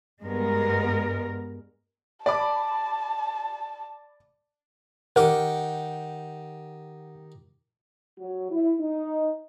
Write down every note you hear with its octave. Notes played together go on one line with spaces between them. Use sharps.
G2 G#3 B3 A#4
D5 A5 B5 D6
D#3 G4 A#4 F#5 D6
F#3
E4
D#4